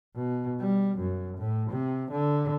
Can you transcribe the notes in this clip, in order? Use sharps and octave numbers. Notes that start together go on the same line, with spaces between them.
B2
G3
F#2
A2
C3
D3